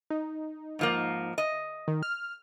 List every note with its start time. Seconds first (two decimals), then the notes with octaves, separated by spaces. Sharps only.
0.10 D#4
0.79 G#2 F3 A#3
1.38 D#5
1.88 D#3
2.03 F6